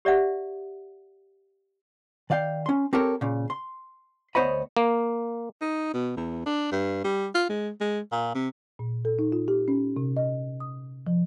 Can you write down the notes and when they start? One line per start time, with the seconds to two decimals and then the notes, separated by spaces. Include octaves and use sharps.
0.05 G4 D5 E5 F#5
2.30 D#3 D5 F5 G5
2.66 C#4 C6
2.93 C4 G4 A4 A#4 C#5
3.21 A#2 C#3
3.50 C6
4.35 D2 B3 C5 C#5 D#5 B5
4.77 A#3
5.61 D#4
5.94 B2
6.17 E2
6.46 D4
6.72 G2
7.04 G3
7.35 F4
7.49 G#3
7.81 G#3
8.12 A#2
8.35 C3
8.79 A#2
9.05 A4
9.19 D#4
9.32 F4
9.48 G4
9.68 C#4
9.97 C3
10.17 D#5
10.60 D#6
11.07 F3